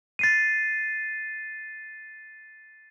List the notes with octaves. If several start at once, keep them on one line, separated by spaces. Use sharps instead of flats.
A6 C7 D#7